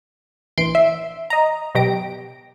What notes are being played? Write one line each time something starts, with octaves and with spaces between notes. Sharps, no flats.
A#1 E3 C6 D7
E5
D#5 A#5
B2 F#3 G4 A#6 D7